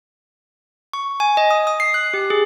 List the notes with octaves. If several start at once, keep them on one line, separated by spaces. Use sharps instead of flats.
C#6
G#5
D#5
D#6
D#6
C7
F#6
G4
G#4